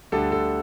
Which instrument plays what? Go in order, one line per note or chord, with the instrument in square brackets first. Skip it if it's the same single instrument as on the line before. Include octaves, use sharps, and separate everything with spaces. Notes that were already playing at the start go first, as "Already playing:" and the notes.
[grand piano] D2 D3 G3 A4
A4